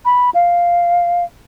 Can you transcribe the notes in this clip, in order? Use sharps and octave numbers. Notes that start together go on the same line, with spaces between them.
B5
F5